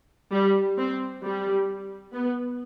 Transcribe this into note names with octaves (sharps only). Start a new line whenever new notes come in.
G3
C4
G3
B3